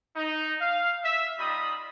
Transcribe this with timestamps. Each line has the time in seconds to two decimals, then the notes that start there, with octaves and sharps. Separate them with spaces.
0.16 D#4
0.61 F5
1.04 E5
1.39 G3 D#4 F4 D#5 B5 D#6